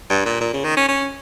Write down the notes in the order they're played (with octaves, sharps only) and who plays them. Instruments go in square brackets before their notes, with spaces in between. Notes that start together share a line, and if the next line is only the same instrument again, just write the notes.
[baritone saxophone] G2
A#2
A#2
C#3
D#3
C#4
C#4